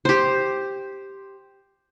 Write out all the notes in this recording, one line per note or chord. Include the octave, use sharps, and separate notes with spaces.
G4 C5